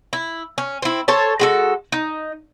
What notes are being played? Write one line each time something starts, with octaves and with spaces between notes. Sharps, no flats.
E4
C#4
C4 E4
A4 C5 C#5 A5
G#3 F#4 A4
D#4